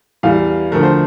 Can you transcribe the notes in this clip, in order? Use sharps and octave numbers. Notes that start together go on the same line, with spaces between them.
E2 E3 G3 F5
D2 D3 F3 A3 A#4
C5